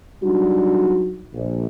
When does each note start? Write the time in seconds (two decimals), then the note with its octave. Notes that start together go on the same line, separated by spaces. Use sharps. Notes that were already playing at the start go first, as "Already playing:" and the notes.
0.22 F#3 G3 D4 D#4 F#4
1.34 A#1